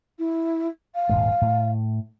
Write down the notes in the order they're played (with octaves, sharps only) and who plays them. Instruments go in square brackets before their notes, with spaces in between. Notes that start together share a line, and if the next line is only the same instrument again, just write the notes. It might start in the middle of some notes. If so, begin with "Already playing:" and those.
[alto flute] E4
F5
[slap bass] D#1 G#2 G#3
A2